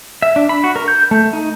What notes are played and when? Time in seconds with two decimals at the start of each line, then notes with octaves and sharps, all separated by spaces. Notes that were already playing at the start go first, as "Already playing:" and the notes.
0.22 E5
0.36 D4
0.49 B5
0.64 F#4
0.76 A#4
0.88 G6
1.11 A3
1.33 D#4